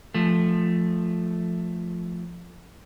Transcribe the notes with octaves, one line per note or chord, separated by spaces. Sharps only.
F3 A3